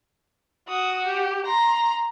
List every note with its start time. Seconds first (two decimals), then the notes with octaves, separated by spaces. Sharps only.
0.68 F#4 D#6
1.05 G4
1.46 A#5 C6